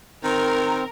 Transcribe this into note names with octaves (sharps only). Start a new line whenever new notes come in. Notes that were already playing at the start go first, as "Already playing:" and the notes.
D#3 C4 A#4